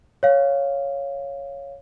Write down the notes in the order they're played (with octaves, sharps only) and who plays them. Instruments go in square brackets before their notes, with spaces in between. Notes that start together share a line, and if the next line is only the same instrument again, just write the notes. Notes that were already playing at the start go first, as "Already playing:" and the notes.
[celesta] C#5 F5